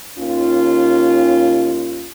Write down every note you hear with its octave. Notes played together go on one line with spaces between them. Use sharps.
D#2 C#4 F4